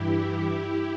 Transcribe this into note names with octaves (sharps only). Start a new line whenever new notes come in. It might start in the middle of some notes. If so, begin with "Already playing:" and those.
Already playing: G2 E3 E4 G4